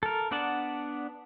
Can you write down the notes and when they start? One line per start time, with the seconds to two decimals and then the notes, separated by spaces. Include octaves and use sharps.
0.03 A4 A#4
0.31 B3 D4 D5 F#5 A5